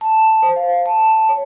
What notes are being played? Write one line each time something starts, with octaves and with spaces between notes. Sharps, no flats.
A5
C5
F5
A5
C#5